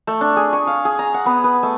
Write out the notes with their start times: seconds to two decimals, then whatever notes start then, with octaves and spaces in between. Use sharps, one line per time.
0.07 A3
0.21 D4
0.36 G#4
0.53 C#6
0.67 F5
0.85 G#4
0.99 A#5
1.14 F#5
1.26 B3
1.44 B4
1.63 A3